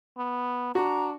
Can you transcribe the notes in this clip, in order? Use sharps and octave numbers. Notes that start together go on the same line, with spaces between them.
B3
D4 F#4 A#5